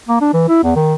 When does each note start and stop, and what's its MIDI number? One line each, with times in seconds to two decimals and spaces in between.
0.09 0.18 58
0.21 0.33 62
0.34 0.44 52
0.48 0.62 64
0.63 0.72 40
0.76 0.95 51